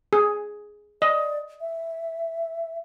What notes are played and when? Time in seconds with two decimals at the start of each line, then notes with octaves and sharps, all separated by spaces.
0.13 G#4
1.02 D5 D#5
1.61 E5